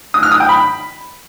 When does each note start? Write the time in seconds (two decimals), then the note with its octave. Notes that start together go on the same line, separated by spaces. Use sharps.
0.14 D#6
0.23 F6
0.32 D#6
0.40 G5
0.49 B5